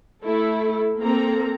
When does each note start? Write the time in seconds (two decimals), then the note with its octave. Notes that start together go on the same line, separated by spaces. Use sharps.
0.22 A3 E4 A4
1.01 A#3 C4 A4 A#5